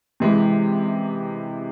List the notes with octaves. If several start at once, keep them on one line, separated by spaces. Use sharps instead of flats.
C3 E3 G#3